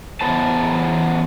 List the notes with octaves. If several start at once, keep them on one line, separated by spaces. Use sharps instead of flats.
E2 E3 B3 A4 C5 A5